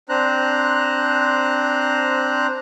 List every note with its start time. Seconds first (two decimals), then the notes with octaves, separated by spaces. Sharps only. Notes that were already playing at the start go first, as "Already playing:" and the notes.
0.09 C4 D4 C5 A#5 F#6